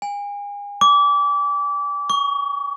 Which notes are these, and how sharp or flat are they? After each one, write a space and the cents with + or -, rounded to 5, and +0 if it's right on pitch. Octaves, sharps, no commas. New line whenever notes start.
G#5 -35
D6 -30
C#6 +30